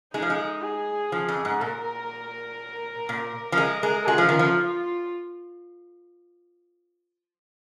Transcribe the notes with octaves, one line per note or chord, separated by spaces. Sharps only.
G#3 D#4
F3
G#3
G#4
F3
F2
G#2
A#2 A#4
A#2
F3
G#3 A#4
G#3
G#3 F4
F3
D#3
F3